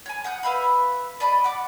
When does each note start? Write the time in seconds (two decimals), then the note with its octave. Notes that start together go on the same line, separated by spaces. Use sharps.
0.06 C#5 G#5
0.24 F#5 D#6 G6
0.43 B4 E5 F5 B5
1.20 D5 D#5 A5 B5
1.44 F#5 D6